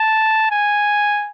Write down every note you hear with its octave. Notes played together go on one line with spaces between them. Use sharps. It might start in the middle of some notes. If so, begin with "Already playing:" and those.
Already playing: A5
G#5